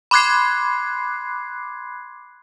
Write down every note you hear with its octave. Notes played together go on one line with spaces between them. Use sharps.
B5 C6 D6 F#6 G#6 C7